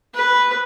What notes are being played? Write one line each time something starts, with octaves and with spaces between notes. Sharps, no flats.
B4